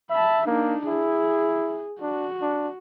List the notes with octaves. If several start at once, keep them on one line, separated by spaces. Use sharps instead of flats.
E5 A5 B5
A#3 D4 D#4
E4 G#4
D4 F#4
D4